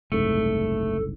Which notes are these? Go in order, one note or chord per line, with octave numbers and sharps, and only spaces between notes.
F#1 C2 G#2 A3 A4